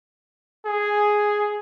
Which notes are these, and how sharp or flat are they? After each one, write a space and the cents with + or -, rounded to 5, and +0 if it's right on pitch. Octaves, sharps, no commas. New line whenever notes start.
G#4 +0